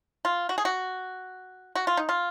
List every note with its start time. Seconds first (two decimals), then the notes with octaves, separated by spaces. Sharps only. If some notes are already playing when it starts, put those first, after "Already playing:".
0.25 F4
0.49 F#4
0.58 G#4
0.65 F#4
1.75 F#4
1.87 F4
1.97 D#4
2.09 F4